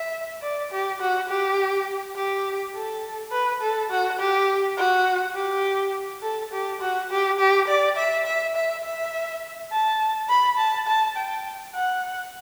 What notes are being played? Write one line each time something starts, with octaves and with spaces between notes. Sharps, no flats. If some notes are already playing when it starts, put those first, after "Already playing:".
Already playing: E5
D5
G4
F#4
G4
G4
A4
B4
A4
F#4
G4
F#4
G4
A4
G4
F#4
G4
G4
D5
E5
E5
E5
E5
A5
B5
A5
A5
G5
F#5